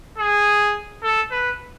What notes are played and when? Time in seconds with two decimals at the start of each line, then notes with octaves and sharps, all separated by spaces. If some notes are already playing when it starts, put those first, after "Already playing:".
0.18 G#4
1.03 A4
1.31 B4